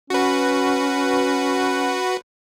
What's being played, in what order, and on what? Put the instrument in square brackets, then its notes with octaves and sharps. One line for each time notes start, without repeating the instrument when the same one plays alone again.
[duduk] C#4 [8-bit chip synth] F#4 B4